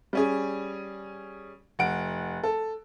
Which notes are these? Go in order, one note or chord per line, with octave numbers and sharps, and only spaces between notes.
G3 C#4 G#4
F1 F#5 D7
A4